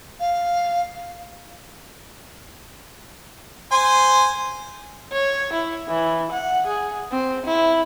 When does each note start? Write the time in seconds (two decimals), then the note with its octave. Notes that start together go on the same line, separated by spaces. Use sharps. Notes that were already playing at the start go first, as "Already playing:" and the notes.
0.20 F5
3.72 C5 G#5 C6
5.12 C#5
5.53 E4
5.89 E3
6.32 F#5
6.67 G#4
7.12 C4
7.46 E4